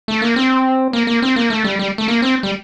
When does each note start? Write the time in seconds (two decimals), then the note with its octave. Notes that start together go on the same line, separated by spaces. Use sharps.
0.08 A3
0.22 A#3
0.36 C4
0.93 A#3
1.07 A#3
1.22 C4
1.36 A#3
1.50 A3
1.64 G3
1.79 G3
1.98 A3
2.08 A#3
2.22 C4
2.43 G3